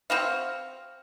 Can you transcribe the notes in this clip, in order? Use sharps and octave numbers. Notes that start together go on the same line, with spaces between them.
C4 F#4 F5